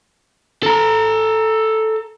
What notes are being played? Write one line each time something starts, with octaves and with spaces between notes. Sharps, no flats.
A4 A#5